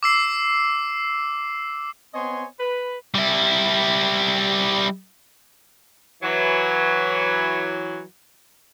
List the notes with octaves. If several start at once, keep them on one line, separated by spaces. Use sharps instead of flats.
D6 E6 C7
B3 C4 C#5 D#5 G#5 C6
B4
G3 E4
E3 F#3